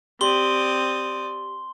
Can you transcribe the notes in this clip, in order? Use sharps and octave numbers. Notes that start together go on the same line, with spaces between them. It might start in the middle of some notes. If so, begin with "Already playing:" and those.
C4 G4 D5 C6 D#6 G7